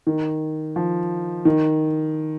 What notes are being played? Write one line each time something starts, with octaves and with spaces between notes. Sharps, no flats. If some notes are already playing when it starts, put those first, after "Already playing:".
D#3
F3
D#3